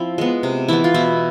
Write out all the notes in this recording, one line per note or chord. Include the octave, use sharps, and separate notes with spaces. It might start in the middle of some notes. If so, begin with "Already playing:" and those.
Already playing: F3 C4 E4
G#3 B3
C3
E3 B3 E4
F4
B2 E4